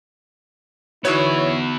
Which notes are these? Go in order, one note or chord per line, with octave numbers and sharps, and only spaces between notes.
D3 B3 D#4 E4 F#4 C#5 E5